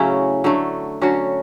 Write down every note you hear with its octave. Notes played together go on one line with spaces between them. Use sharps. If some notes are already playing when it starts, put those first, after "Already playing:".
Already playing: A2 C#3 F#3 A3 C#4 E4
D3 F#3 A3
D3 F#3 C#4 F#4